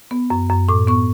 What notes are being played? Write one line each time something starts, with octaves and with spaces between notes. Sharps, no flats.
B3
F#2
F#2
A2 D6
B3 C#6